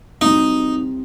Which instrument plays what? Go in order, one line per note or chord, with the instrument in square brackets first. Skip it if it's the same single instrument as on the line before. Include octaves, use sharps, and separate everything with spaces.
[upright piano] C2 C3 F#3 C4 [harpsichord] D#4